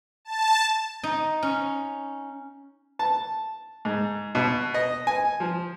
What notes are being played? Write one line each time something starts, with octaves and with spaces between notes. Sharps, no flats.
A5
D#4
C#4
A5
G#2
B2
D#5
G#5
F3